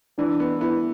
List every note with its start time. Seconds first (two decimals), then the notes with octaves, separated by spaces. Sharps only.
0.18 E3 D4
0.40 B3
0.61 B3 E4